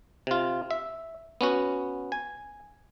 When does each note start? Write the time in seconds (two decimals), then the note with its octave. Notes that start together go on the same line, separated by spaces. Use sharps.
0.27 C3 F4
0.71 E5
1.41 B3 C#4 F#4
2.12 G#5